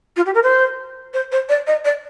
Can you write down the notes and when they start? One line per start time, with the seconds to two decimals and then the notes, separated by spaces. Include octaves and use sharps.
0.16 F4
0.26 G4
0.35 A#4
0.43 C5
1.14 C5
1.32 C5
1.49 D5
1.67 D#5
1.85 D5